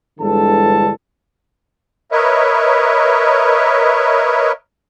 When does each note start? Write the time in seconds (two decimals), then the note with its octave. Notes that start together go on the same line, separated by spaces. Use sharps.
0.20 G1 D3 E3 G#3 A4 A5
2.12 A#4 B4 C#5 D#5 E5